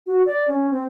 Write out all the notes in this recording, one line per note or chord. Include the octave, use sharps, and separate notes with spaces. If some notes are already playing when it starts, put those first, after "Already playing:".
F#4
D5
C#4
C4